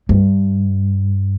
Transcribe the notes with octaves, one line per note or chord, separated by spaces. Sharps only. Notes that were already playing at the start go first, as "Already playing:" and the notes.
G2